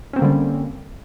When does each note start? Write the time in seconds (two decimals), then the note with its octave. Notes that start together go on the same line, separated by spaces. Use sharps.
0.13 C#4
0.16 C4
0.19 A#3
0.22 D3
0.24 G3